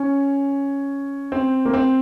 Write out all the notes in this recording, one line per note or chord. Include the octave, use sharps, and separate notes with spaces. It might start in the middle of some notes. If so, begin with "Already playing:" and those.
Already playing: C#4
C4
A#3
C4